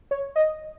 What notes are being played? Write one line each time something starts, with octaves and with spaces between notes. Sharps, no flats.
C#5
D#5